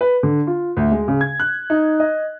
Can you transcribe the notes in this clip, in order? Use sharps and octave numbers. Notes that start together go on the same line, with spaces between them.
B4
D3
F4
D2
G#3
C#3
G#6
F#6
D#4
D#5